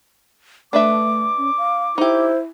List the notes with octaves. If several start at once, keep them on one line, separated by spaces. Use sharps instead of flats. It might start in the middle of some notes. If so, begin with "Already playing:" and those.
A3 D4 B4 E5 D6
C#4
F5
D#4 E4 G4 C5